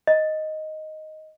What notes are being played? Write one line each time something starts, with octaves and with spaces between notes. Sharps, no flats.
D#5